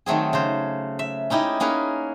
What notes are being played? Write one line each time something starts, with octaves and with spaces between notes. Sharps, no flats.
D#3 F#3 A3 C4 G#4
C#3 C5
E5
C#4 D#4 E4 G4 D#5
A#3 C#4 G#4 A#4 B4